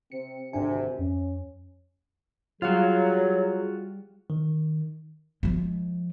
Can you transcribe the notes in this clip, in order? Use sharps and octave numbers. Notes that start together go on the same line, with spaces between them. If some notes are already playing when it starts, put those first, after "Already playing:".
C3 C4 C#7
G#1 D2 G#2 C3 D4 G#5
F2 C#4
F#3 G3 F4 F#4 G#4 F5
D#3
F3 G#3